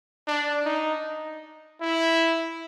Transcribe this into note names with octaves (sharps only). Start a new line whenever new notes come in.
D4
D#4
E4